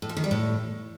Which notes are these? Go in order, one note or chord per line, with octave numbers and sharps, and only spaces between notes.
A2
F3
D#3
G3
A2